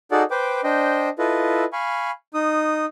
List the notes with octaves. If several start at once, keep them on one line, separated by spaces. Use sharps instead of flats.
D#4 F#4 G#4 A4 D5 F#5
B4 C5 G5 D6
D4 C5 D#5 G5
E4 F4 A4 B4 D#5
F5 G#5 B5 C#6
D#4 D#6